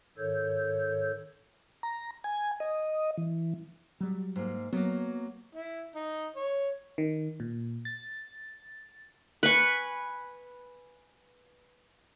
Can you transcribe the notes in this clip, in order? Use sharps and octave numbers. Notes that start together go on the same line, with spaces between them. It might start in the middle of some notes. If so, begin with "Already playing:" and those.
G#2 D#3 A4 C#5 G6
A#5
G#5
D#5
E3
F#3 G3
G#2 A#3
F#3 A#3 B3
E4
D#4
C#5
D#3
A#2
A6
B4 G#5 C#6